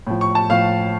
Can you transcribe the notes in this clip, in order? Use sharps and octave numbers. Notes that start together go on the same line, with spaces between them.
A2 F3
C#6
A5
A2 F3 F5